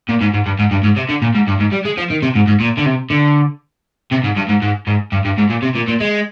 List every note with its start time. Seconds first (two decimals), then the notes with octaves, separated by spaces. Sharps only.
0.09 A#2
0.21 G#2
0.34 G#2
0.46 G2
0.59 G#2
0.71 G2
0.84 G#2
0.97 C3
1.09 D3
1.22 A#2
1.35 G#2
1.47 G2
1.59 G#2
1.72 G3
1.85 G#3
1.97 F3
2.10 D#3
2.22 C3
2.35 G#2
2.47 G#2
2.60 A#2
2.77 D3
2.86 C3
3.10 D3
4.11 C3
4.24 G#2
4.36 G2
4.49 G#2
4.62 G#2
4.87 G#2
5.12 G2
5.25 G2
5.38 G#2
5.50 A#2
5.62 C3
5.75 A#2
5.88 A#2
6.00 G#3